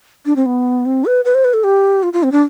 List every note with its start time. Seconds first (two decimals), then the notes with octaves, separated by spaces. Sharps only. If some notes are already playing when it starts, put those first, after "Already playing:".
0.26 D4
0.36 C4
0.46 B3
0.86 C4
1.05 B4
1.25 B4
1.35 C5
1.45 B4
1.54 A4
1.64 G4
2.03 F4
2.13 F4
2.23 C4
2.32 D4